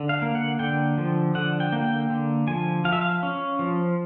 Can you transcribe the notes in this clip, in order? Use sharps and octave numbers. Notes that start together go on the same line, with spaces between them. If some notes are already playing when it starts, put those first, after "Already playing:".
Already playing: D3
F5
A#3
F#5
D3 G5
F3
D3 F#5
G5
A#3
G5
D3
F3 G#5
F3 F5
E5
F5
C#4
F3